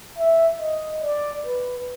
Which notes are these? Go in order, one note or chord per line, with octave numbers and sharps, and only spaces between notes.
E5
D#5
D5
B4